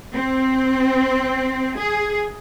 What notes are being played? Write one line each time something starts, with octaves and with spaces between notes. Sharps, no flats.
C4
G#4